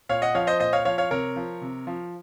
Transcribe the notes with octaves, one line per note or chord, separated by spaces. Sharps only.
A#2 C#5 F5
D#5 F#5
F3 C#5 F5
C5 D#5
A#2 C5 D#5
C#5 F5
F3 C#5 F5
C#5 F5
C3 A#4 C#5
F3
C3
F3